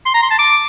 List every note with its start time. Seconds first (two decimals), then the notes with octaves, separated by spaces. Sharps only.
0.06 C6
0.14 A#5
0.22 C6
0.30 A5
0.39 D6